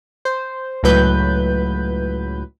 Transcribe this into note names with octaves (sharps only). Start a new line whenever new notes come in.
C5
C#2 A2 F#3 B4 G6